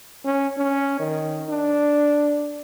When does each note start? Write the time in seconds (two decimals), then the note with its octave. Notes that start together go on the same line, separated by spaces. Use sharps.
0.25 C#4
0.58 C#4
0.99 D#3
1.49 D4